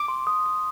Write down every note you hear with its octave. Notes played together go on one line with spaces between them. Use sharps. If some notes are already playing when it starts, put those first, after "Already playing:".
Already playing: D6
C6
D#6
D#6